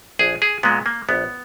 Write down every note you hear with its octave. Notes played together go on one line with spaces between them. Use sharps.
A#1 G#4
G#4
A#2 G#3 B3
A#3
A#1 B3